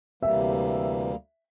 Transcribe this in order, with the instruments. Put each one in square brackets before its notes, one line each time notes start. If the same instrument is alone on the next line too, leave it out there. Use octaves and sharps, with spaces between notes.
[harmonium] D2 C3 E3 G3 A#3 [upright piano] E5